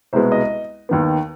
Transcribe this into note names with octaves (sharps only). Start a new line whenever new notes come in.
C2 B2 G#3 B3 C5
D#5
D#2 D#3 B3